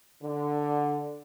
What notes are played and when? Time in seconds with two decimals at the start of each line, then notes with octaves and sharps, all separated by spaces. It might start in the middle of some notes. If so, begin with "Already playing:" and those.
0.23 D3